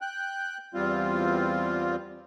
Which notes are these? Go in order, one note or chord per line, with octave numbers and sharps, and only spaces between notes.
G5 F#6
E2 G3 C4 F4